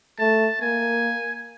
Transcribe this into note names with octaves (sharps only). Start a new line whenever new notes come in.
A3 A5
A#3 G#5